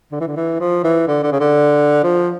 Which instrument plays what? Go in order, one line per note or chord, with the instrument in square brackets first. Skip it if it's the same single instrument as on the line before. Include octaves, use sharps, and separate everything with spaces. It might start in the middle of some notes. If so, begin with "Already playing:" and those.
[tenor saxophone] D3
E3
D3
E3
F3
E3
D3
D3
C#3
D3
F3